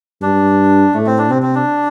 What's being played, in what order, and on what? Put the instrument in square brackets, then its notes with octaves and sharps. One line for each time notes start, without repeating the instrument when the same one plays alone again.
[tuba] G2 [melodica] D4
[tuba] A2 [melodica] A3
[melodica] C4
D4
[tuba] C3 [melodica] C4
[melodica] C4
D4